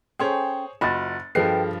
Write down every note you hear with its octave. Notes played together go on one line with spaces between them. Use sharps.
C#4 G#4 A4 C5 C#5 G5
F#1 F4 F#4 D#5 B5 A6
G2 F3 G#4 A4 B4 D#5 G5 C7